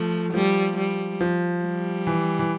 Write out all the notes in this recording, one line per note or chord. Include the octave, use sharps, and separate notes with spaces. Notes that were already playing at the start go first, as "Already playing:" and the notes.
Already playing: F3 A3
F3 G3
G3
F3
G3
E3
E3